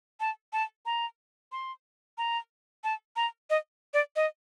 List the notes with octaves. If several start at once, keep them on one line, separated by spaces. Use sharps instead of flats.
A5
A5
A#5
C6
A#5
A5
A#5
D#5
D5
D#5